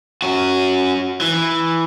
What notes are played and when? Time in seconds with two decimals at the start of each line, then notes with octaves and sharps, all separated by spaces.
0.22 C#4 F#4
1.21 E3